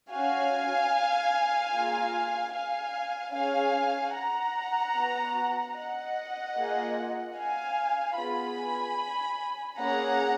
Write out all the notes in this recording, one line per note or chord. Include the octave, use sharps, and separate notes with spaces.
C#4 F#4 F5 G#5
A#3 F4 G#4
F5 G#5
C#4 G#4 F5 G#5
F#5 A#5
B3 F#4
D#5 F#5
A#3 F4 G#4
F5 G#5
B3 F4 G#4 G#5 B5
A#3 C#4 G#4 F#5 A#5